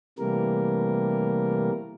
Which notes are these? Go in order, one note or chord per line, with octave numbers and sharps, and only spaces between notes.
C3 E3 G3 A3 A#3 A#4